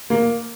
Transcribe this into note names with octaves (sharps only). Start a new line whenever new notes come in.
A#3